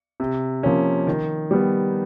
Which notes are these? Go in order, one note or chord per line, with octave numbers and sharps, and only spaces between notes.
C3
F3 A#3 C#4
D#3
G3 B3